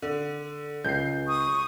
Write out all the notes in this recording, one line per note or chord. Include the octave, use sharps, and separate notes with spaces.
D3
C#2 G6 C7
C#6 D#6